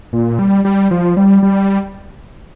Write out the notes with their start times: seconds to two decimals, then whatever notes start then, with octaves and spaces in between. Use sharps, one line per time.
0.13 A#2
0.39 G3
0.65 G3
0.91 F3
1.17 G3
1.43 G3